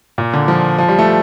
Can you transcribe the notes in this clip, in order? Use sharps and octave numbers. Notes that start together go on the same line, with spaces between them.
A#2
D3
F3
F3
G3
A3